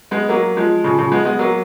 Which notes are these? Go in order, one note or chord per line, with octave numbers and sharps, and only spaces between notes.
G#3 B3
F#3 A#3
F3 G#3
C#3 F3
C#3 F3
G#3 B3
G#3 B3
F#3 A#3